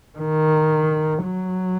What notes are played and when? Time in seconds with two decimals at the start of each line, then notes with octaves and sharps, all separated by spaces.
0.18 D#3
1.24 F#3